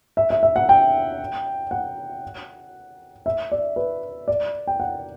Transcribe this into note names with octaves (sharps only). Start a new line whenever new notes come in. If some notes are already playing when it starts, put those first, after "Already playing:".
E5
E5
E5
F#5
G5
F#5
E5
D5
B4
D5
G5
F#5